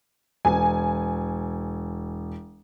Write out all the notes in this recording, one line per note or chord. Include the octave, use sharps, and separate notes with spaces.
E1 G#5